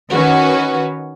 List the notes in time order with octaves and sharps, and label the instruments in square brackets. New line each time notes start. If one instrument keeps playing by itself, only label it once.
[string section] D#3 C#4 F#4 B4